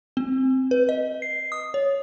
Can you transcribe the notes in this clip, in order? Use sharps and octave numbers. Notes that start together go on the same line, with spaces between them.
C4
B4
D#5
C7
D#6
C#5